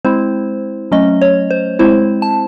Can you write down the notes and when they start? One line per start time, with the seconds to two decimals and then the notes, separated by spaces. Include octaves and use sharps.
0.05 G#3 C4 E4 C5
0.91 F#3 A3 C#4 D#5
1.21 C#5
1.51 C5
1.79 G#3 C4 E4 C5
2.22 A5